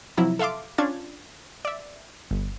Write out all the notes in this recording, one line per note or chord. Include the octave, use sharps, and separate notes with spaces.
C3 F3 F#3 E4 A#5
A4 E5 F5 C6 D6
C#4 D4 F4 G#6 A6
D5 E5
G1